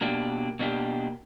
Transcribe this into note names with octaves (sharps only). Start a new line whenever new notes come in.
B2 A#3 D4 G4
B2 A#3 D4 G4